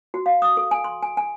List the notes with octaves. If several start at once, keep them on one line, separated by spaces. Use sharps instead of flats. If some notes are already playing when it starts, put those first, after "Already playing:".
F#4
F5
D#6
A4
G#5
C6
G#5
G#5